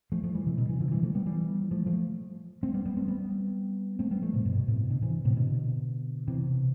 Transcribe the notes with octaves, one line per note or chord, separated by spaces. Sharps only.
F3 A3
F3 A3
E3 G3
C3 E3
B2 D3
C3 E3
D3 F3
E3 G3
F3 A3
G3 B3
E3 G3
F3 A3
F3 A3
A3 C4
G3 B3
G3 B3
A3 C4
G3 B3
A3 C4
G3 B3
F3 A3
A2 C3
G2 B2
A2 C3
B2 D3
C3 E3
A2 C3
B2 D3
C3 E3